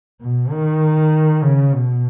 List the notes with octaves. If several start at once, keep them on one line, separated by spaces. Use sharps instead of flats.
B2
D#3
C#3
B2